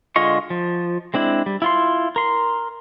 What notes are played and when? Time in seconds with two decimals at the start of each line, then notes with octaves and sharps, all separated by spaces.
0.16 D3 G#3 F4 D#5 C#6
0.50 F3
1.14 G#3 C4 D4 E4
1.46 G3
1.62 E4 F4 C6
2.16 A#4 C6